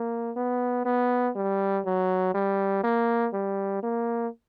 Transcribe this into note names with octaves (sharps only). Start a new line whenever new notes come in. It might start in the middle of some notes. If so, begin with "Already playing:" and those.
Already playing: A#3
B3
B3
G3
F#3
G3
A#3
G3
A#3